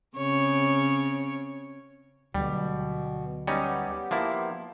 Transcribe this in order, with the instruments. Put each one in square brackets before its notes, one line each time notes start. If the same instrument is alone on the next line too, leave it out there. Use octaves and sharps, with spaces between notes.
[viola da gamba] C#3 C4 C#5
[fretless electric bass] D2 D3 F#3 [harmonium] B2 [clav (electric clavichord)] G3
[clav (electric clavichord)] G3 C#4 D#4 [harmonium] B3 G4
[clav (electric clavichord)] F3 A#3 E4